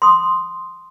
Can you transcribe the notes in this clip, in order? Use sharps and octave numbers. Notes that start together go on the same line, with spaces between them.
C6 D#6